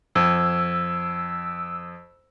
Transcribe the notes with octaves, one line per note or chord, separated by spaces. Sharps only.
F2 E6